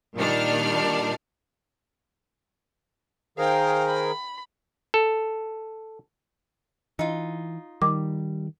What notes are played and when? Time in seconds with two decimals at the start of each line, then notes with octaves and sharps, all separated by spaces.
0.16 A#2 D#3 G3 D4 F6
3.38 D#3 G#4 A#4 C5 F5 G5
3.86 B5
4.94 A4
6.99 E3 D#4 F4
7.82 D#3 G3 D6